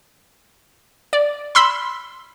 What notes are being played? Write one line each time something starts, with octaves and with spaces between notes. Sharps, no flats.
D5
B5 C6 E6 B6